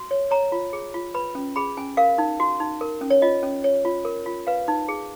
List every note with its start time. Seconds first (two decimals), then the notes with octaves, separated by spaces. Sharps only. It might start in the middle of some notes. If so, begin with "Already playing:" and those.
Already playing: F#4
0.11 C#5
0.31 C#5 A#5
0.52 F4
0.73 G#4
0.94 F4
1.14 B4 B5
1.35 C#4
1.56 G#4 B5
1.77 C#4 G#5
1.97 A#4 F5
2.18 D#4
2.40 F#4
2.60 D#4
2.81 A#4
3.01 C#4
3.10 C#5
3.22 F4 D#5
3.43 C#4
3.64 C#5
3.85 F4
4.05 A#4
4.26 F4
4.47 B4 F5
4.68 D#4
4.88 G#4